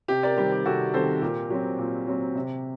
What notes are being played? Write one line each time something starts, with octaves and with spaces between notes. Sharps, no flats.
C3 G4
A#4 D5
D#3 G3 C4 G4
G4
C3 F#4 A4
D#3 G3 C4 A4 C5
A#2 G4 A#4
F#3 C4 G4
A#2
F#3 C4
C3